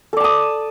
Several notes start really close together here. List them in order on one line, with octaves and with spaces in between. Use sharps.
A4 D5 A5 D#6